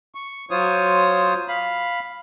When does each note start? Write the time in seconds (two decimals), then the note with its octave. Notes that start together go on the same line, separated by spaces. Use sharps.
0.15 C#6
0.51 F#3 F4 C5 C#5 D#6
1.48 F5 B5